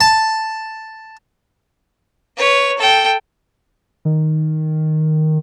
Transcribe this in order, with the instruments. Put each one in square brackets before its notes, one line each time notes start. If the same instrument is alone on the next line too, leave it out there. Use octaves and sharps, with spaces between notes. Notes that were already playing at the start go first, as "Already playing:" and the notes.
[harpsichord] A5
[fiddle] B4 C#5
A4 G5
[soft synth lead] D#3